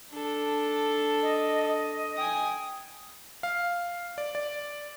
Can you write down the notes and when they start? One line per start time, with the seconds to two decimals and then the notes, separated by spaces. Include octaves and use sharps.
0.11 D4 A4
1.22 D#5
1.68 D#5
2.17 G5 G#5 D#6
3.43 F5
4.18 D5
4.35 D5